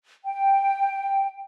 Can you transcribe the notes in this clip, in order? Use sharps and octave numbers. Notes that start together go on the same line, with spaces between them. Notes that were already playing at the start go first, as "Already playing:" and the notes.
G5